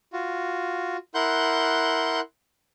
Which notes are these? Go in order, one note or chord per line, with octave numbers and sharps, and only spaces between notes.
F4 F#4
E4 A#4 F#5 C6 F#6 G6